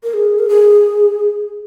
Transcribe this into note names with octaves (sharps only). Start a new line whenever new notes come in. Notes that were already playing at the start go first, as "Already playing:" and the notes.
A#4
G#4
A#4
G#4